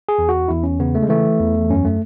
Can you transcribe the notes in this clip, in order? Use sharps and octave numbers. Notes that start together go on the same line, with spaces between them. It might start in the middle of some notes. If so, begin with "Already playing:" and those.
G#4
E2
F#4
E2 E4
C#4
C#3 B3
A3
G#3
E3 A3
E2
F#2 C#4
A3